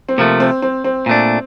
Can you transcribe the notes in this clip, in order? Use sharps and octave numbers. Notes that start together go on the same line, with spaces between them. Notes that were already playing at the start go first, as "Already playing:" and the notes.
C4
C3 F3 A3 A#3
C4
C4
C4
A#2 A3 D4